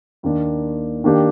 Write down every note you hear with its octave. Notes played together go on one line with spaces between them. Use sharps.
D#2 D#3 A#3 D4
D#3 A#3 D4 G4